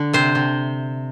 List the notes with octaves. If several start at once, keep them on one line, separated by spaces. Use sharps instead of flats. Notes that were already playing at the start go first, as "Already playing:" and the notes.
Already playing: D3
C3 C5
C3